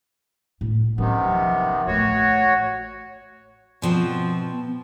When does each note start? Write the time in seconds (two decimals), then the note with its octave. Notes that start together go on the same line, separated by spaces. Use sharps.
0.61 A2
0.98 C3 D#3 F#3 B3 C#4
1.31 F3
1.87 A1 A3 F#4 C#5
3.82 B2 F3 C4